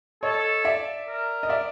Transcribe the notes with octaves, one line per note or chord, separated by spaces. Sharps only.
A4 C#5 D#5
D5 E5
A#4
D#5
D5 E5